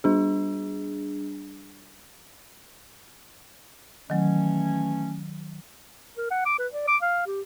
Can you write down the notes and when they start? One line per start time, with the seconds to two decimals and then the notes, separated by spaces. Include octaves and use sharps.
0.04 G3 D4 G#4
4.10 D#3 E3 F#3 A3 C#4
6.17 A#4
6.31 F#5
6.46 D6
6.59 B4
6.72 D5
6.88 D6
7.02 F5
7.26 G4